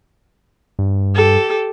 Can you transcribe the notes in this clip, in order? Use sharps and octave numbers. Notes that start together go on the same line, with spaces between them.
G2
G4 A4